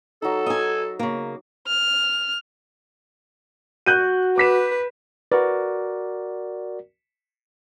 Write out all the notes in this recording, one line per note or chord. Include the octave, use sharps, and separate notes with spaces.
F#3 D#4 A4
D#5 G#5
C#3 A#3
F6
F#4 F#6 G6 D#7
B4 D6 B6 E7
F#4 A#4 B4 D5